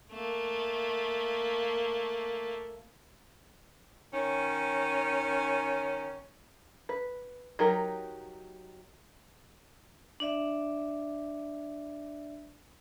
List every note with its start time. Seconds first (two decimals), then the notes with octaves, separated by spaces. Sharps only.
0.12 A3 A#3
4.12 D#3 C#4
6.89 B4
7.59 F#3 D#4 G4 A#4
10.20 D4 D5 E5